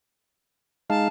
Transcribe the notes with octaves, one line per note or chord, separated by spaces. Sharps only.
G#3 D#4 F5 A5